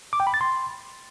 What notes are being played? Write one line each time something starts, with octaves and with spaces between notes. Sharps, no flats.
D6
G5
B5
A6
C6